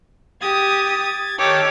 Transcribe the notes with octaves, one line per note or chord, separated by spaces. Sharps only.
G4 D#6 G#6 A6
D#3 G4 A4 C#5 D6